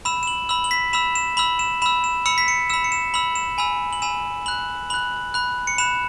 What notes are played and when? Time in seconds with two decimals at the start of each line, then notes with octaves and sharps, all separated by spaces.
0.05 B5 E6 E7
0.23 E7
0.27 F#7
0.49 B5 E6 F#7
0.64 F#7
0.71 B6
0.93 B5 E6 E7
1.15 E7
1.37 B5 E6 F#7
1.59 E7
1.82 B5 E6 E7
2.04 E7
2.26 B5 E6 C#7
2.38 B6
2.48 C#7
2.70 B5 E6 E7
2.84 C#7
2.92 E7
3.14 B5 E6 F#7
3.36 E7
3.58 G#5 B5 E6
3.93 F#7
4.02 G#5 B5 E6 E7
4.46 B5 F#6 F#7
4.90 B5 F#6 F#7
5.34 B5 F#6
5.67 C#7
5.78 B5 F#6 E7